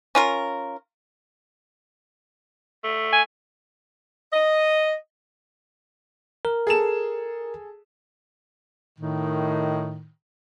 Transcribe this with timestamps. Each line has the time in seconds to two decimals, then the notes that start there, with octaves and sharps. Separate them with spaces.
0.15 C#4 F4 A#4
2.84 A3
3.13 G#5
4.33 D#5
6.45 A#4
6.67 G#4 A4 E7
8.98 A2 D#3